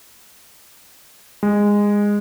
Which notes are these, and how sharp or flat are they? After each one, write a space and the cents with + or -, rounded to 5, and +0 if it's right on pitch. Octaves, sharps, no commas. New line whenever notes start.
G#3 -15